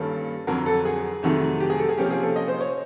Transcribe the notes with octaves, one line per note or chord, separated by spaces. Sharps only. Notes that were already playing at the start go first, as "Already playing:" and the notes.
Already playing: G2 D#3 G3 A#3 C#4 A4
F2 D3 F#3 A#4
A4
G#4
F2 C3 D#3 F#3 A3
G4
G#4
A4
G#4
C3 F3 A#3 C#4 G4
G#4
A4
D#5
C5
C#5